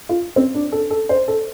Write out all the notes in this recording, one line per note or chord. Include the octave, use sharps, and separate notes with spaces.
F4
C4
D4
A4
A4
C5
A4